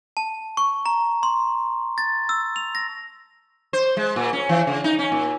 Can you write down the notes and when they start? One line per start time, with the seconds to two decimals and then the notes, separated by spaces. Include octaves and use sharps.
0.17 A5
0.57 C#6
0.86 A#5
1.23 C6
1.98 A6
2.29 E6
2.56 F7
2.75 A#6
3.73 C5
3.97 G#3
4.16 A#2
4.33 C#4
4.49 E3
4.67 C#3
4.84 D#4
4.99 C#4
5.12 A#2